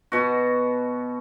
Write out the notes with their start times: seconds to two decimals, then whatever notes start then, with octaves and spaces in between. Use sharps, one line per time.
0.12 B2 F#4